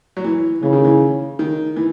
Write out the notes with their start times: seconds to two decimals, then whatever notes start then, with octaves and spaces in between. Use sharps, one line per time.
0.17 F#3
0.24 E3
0.63 C#3 E3
0.73 D#3
0.84 E3
1.39 D#3
1.76 E3